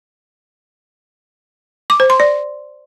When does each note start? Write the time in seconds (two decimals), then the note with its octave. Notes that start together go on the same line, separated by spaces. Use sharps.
1.90 D6
2.00 C5
2.10 C6
2.20 D5